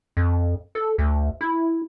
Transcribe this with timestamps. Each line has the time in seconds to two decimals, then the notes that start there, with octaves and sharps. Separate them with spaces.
0.17 F2
0.75 A4
0.98 D2
1.41 E4